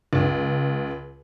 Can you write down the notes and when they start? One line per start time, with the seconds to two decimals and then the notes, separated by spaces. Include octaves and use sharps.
0.13 C#2